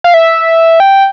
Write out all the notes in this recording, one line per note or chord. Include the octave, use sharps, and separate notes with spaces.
F5
E5
G5